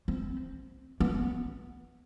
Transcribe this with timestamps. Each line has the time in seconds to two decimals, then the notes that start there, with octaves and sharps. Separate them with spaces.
0.08 C4
1.00 B3